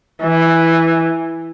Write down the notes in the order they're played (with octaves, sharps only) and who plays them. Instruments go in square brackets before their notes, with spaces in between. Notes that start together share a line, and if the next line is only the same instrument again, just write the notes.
[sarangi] E3